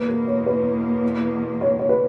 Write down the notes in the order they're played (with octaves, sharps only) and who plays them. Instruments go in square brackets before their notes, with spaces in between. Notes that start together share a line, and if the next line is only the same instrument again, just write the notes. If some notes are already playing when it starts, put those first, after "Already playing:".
Already playing: [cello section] E2 B2 A#3 [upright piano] B4
[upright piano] A#4
C#5
B4
C#5
C#5
B4